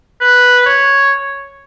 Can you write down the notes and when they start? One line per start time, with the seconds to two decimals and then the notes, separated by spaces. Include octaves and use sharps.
0.21 B4
0.66 C#5